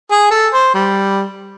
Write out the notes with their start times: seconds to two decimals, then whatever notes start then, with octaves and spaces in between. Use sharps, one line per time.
0.11 G#4
0.31 A4
0.53 C5
0.74 G3